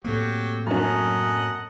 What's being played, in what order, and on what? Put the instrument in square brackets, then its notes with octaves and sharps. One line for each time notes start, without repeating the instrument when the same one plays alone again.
[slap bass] A2 A3 A#3 [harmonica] F#3 G4 [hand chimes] C4 A4
[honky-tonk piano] F#2 C#4 [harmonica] D#5 F#5 A5